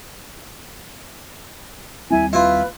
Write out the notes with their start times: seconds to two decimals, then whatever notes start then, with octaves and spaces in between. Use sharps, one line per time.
2.11 D#2 G3 C4 E4 G#5
2.33 E4 F4 B4